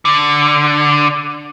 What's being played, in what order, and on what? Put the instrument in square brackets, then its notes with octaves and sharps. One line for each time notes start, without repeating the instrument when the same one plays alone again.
[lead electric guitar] D3